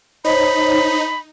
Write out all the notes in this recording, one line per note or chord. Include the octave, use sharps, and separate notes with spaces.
D#4 C5 C#5 B5